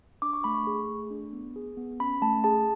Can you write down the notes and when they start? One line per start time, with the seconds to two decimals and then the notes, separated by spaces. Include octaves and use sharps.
0.22 D4 D6
0.33 C#6
0.44 A3 B5
0.55 C#6
0.67 G#4
0.89 A3
1.10 D4
1.33 B3
1.56 G#4
1.77 B3
2.00 C#4 B5
2.22 A3 A5
2.44 G#4 A5